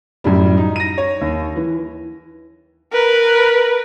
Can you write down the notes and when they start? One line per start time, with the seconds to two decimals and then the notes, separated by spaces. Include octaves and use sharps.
0.24 F#2 A2 G3
0.57 D#4
0.76 A#6 D#7
0.98 C#5
1.21 D#2
1.56 E3
2.93 A#4 B4